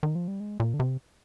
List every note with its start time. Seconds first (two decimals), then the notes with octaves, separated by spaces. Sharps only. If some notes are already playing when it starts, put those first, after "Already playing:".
0.03 D#3
0.15 F3
0.28 G3
0.40 G#3
0.60 A#2
0.74 D3
0.80 C3